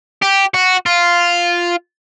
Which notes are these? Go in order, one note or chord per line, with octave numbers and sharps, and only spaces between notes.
G4
F#4
F4